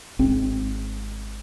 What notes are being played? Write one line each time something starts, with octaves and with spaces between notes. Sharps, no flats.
G#1 G#2 C4